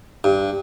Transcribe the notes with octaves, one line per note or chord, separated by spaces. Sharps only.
G2